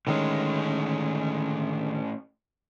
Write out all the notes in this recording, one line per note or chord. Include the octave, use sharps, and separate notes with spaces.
A2 D3 D#3 G#3 C#4